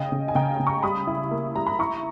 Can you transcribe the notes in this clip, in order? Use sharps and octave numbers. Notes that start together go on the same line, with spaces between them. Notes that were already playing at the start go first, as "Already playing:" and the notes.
Already playing: C#3 D#5 G5
C#3
G#5
C#3 G5 A#5
C#3
A#5 C#6
G3 B5 D#6
E4
A#3
G3 A#5
B5
E4 A#5 C#6